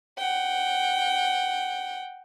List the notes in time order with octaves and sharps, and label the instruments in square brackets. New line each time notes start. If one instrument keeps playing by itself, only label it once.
[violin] F#5 G5